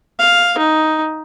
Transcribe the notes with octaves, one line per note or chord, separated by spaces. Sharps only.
F5
D#4